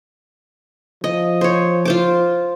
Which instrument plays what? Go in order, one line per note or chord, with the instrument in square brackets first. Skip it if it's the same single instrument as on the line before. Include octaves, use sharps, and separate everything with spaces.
[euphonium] F3 [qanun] D#5
[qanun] C5 C#5
F4 C5 D6